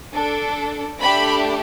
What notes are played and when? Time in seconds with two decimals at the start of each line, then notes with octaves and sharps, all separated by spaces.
0.13 D4 A4
0.99 A3 D4 G4 B5